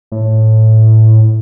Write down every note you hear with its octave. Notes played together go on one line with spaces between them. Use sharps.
A2